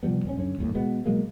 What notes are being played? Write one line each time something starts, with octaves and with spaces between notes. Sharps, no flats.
C3 F3 G3 B3
D#1 C4 C#4
F#2 D3 C#4
G1 D#2 A2
B2 G#3 B3
B2 F#3 G#3 A#3